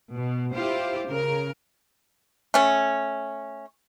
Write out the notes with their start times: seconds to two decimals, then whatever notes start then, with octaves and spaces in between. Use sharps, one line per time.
0.13 B2
0.53 E4 F4 G4 C5
1.06 C#3 A#4
2.54 A3 C#4